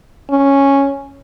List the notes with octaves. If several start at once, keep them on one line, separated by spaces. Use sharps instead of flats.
C#4